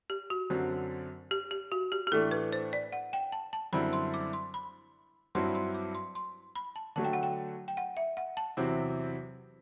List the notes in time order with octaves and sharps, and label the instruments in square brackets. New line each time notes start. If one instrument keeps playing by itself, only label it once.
[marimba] G4
F#4
[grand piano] F#2 D3 F#3 C4
[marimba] G4
G4
F#4
G4
G4
[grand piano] A2 E3 A3 D4 [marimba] A4
[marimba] B4
C5
D5
F#5
G5
A5
A5
[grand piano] F#2 D3 G3 C4 E4 [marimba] B5
[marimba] C6
D6
C6
B5
[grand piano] G2 F#3 C4 E4 [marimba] C6
[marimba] C6
D6
C6
C6
B5
A5
[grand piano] D3 F#3 A3 [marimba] A5
[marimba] G5
F#5
G5
G5
F#5
E5
F#5
A5
[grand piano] E2 C3 F#3 C4 E4